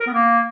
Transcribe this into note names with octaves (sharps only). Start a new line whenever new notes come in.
A#4
B3
A#3